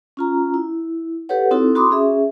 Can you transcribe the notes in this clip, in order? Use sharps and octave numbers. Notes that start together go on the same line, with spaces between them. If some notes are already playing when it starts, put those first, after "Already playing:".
C#4 F4 A#5
E4
G4 A4 B4 C#5 F#5
C4 D#4 E4 F#4 A4
F#4 B5 C6 D6 D#6
C#4 G#4 E5